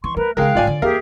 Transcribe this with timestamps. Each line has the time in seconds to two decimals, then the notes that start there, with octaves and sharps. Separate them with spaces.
0.04 E3 C6 C#6
0.17 A3 A#4 B4
0.37 C#3 G#3 D#4 A#4 F5 G5 F#6
0.55 C2 G#2 F4 D5 G#5
0.67 D3
0.82 D#2 G4 G#4 A#4 E5 F5